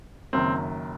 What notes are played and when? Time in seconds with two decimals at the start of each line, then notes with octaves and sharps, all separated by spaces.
0.33 F#1 F#2 D#3 C4